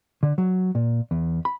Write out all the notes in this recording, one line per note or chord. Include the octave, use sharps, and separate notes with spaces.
D3
F#3
A#2
E2
B5